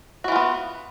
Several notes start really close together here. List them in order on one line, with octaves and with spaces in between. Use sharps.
F#4 E3 F4 B3